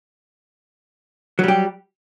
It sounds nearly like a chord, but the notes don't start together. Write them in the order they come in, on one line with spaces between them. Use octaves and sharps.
F#3 G3 G4